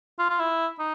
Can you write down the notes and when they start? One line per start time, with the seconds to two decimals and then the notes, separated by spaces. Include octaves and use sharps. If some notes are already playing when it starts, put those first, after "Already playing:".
0.19 F4
0.30 F4
0.39 E4
0.79 D#4